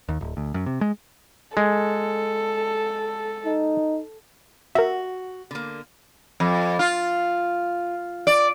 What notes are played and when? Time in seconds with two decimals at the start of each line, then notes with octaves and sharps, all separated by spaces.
0.09 D#2
0.21 D1
0.37 D2
0.54 F#2
0.66 C3
0.81 G#3
1.57 G#3 A4
3.46 D#4
4.75 F#4 A#4 E5
5.51 D3 A#3
6.40 F2
6.79 F4
8.27 D5